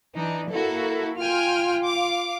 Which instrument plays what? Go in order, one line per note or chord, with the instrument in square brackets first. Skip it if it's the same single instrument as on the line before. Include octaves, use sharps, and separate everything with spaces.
[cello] E3 [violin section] D4 D#4
[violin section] A#3 F#4 A4 [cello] E4
[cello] F4 [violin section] G5 G#5 F6
[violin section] F5 D6